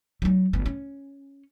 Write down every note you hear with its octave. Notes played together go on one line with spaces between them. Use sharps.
F#3 D#4
G1 B3
C#4